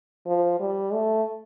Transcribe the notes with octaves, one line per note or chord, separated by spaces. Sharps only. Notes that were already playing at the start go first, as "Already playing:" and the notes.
F3
G3
A3